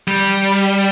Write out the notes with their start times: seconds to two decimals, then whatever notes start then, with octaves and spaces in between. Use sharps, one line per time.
0.08 G3